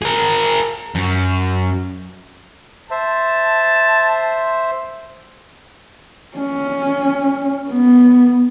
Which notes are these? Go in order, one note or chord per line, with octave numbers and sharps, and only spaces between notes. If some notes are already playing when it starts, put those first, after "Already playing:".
G#4 A#4
F#2
C5 E5 A5
C#4
B3